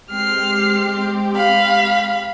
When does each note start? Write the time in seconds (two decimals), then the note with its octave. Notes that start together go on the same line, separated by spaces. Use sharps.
0.10 G#3 C4 G4 F6 C7
1.35 F5 B5